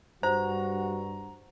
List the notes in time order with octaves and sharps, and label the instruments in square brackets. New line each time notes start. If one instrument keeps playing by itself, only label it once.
[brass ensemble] G2 [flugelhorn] F#4 [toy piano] C5 [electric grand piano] A#5